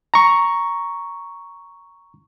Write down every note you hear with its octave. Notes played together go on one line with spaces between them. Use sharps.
A#5 C#6